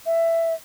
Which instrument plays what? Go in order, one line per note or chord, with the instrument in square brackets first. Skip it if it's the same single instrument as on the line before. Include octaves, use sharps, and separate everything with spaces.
[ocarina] E5